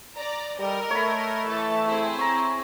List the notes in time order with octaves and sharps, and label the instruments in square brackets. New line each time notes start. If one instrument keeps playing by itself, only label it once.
[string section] D5 A#5
[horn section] G3 [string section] A4 A#4 D#5
[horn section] A3 [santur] C#5 B5
[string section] E3 A4 A5
C4 E4 G#4
[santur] A#5 C#6